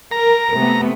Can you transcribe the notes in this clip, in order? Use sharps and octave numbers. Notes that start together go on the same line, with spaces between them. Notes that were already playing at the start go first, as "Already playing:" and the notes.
A#4 A#5
C3 A3 B3